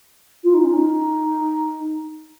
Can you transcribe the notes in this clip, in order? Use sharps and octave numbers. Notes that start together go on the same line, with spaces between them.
F4
D#4
C#4
D#4